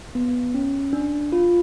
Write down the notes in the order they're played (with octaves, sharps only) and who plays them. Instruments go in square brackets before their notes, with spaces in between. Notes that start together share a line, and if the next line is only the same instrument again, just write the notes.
[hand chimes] B3
C#4
D4
F4